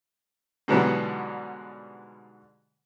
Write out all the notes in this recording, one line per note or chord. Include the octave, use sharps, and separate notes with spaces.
G#2 B2 D3 E3 F#3 G3